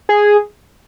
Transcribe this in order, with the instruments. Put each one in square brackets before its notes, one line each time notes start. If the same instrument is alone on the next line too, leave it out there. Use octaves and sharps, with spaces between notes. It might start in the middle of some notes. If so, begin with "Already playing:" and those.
[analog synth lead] G#4